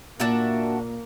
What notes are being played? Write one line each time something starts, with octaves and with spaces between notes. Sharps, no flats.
A#2 A#3 D4 F#4 E5